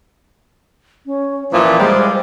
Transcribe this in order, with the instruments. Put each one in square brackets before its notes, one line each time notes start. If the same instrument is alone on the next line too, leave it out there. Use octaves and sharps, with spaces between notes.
[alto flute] C#4
[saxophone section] A#2 E3 F3 [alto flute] C5
[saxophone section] G3 G#3